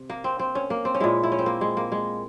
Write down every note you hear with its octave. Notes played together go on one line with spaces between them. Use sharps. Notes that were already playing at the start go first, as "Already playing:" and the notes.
Already playing: C3
A#3
C4
C4
C#4
A#3
C4
C#4
A#2 G#3 E4
E4
C#4
C4
A#3
G#3
A#3
G#3